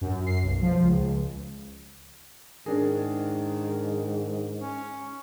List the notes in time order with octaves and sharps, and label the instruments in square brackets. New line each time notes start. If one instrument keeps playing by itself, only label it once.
[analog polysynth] F#2
C7
B1
F3
C#2
[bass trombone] G#2 [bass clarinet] D#3 [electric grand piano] C#4 D4 G#4 [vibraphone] A#4
[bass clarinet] C#4